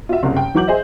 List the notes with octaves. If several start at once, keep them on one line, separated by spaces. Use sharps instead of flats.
F4 F#4 E5
F#1 C2
G5
E3 F#3 F#5 D6 G6 F#7
G#4 C5 D#5 E5